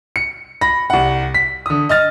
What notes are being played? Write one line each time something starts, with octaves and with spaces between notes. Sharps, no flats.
C#7
B5 A#6
C2 F#5
B6
D3 D#6
D#5 F6 A6